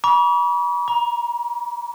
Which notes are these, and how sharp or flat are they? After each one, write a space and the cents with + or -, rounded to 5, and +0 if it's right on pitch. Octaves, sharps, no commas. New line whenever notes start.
B5 -40 D6 -45
A#5 +25 D6 -45